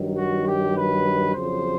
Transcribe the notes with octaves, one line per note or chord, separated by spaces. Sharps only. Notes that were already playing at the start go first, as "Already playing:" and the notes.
Already playing: G2 D#3 F#3
F#4
G4
B4
F2 C#3 F#3 C5